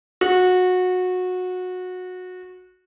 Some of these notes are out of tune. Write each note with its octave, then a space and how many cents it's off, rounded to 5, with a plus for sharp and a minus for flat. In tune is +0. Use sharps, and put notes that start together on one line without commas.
F#4 -20